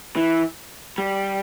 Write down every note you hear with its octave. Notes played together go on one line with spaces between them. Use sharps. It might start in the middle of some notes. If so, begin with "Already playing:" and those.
E3
G3